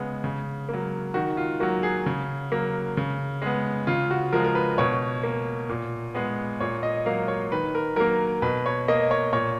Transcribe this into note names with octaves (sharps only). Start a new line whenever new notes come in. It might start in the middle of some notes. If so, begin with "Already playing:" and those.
Already playing: C#3 G#3 B3
C#3
F#3 A#3
D#3 F#4
F4
F#3 A#3 F#4
G#4
C#3
F#3 A#3
C#3
G#3 B3
C#3 F4
F#4
F3 G#3 A#4
A#4
B4
B2 C#5
A#3
A#2
G#3 B3
A#2 C#5
D#5
F#3 A#3 F5
C#5
D#3 B4
A#4
F#3 A#3 A#4
B2 B4
C#5
A#3 D#5
C#5
A#2 C#5